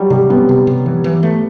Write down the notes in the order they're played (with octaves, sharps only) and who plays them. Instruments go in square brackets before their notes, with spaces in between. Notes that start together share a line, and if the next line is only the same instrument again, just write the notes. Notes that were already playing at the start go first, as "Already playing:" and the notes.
Already playing: [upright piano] F#3 G3
[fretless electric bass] C3 [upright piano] G3
[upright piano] B3 [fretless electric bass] C4
[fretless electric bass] C3
C3
E3
E3
A3